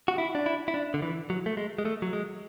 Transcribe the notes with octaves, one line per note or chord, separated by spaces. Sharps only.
F#4
E4
D4
E4
E4
D4
D3
E3
F#3
A3
G#3
G#3
A3
F#3
G#3